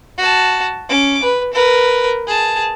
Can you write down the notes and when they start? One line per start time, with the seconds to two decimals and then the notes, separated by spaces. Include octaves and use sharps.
0.18 F#4 A5
0.89 C#4 D6
1.23 B4
1.53 A#4 B4
2.27 G#4 A5